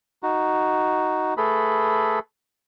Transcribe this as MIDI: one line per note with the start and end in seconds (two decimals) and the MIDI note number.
0.23 1.34 63
0.23 1.34 66
1.37 2.19 57
1.37 2.19 68
1.37 2.19 69
1.37 2.19 71
1.37 2.19 83